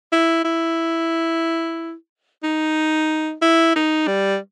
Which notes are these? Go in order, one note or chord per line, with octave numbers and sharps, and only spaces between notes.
E4
E4
D#4
E4
D#4
G3